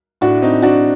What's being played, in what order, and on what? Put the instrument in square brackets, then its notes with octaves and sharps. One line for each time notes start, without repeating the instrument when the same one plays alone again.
[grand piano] A2 D4 F#4
C4 D#4
D4 F#4